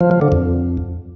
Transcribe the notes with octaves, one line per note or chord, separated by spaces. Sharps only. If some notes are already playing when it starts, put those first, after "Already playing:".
F3
F3
D3
F2